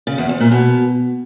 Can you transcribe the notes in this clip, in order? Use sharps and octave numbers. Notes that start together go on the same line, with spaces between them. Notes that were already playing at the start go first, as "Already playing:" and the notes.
C#3
E2
F2
A#2
B2